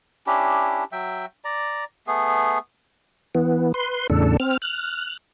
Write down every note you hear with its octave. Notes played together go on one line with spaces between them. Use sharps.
C#4 D4 E4 G4
F#3 E5 G5
D5 A#5
A3 B3 G#4
E3 B3
B4 C6
E2 A2 C#3 D4 A4
C4 F6
F6 F#6